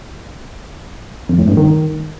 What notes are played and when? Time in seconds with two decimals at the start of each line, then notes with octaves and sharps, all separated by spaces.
1.29 F2
1.39 A2
1.48 G2
1.57 D#3